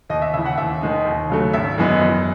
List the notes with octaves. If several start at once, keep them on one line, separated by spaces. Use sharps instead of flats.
D#2 D#5
E5
C#3 E3 E5
F#5
D#2 E5
D#3 G#3 D#4
D#2
C#3 F#3 A3
G#1 E5
F#2 E3 G#3 B3
F#2